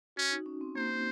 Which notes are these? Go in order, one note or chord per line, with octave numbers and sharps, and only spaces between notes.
C#4 F#4
D#4
C#4
C4
A#3 C5
A#3